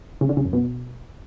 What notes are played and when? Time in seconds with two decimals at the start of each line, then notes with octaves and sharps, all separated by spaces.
0.21 C#3
0.29 D3
0.37 C#3
0.45 F#2
0.53 B2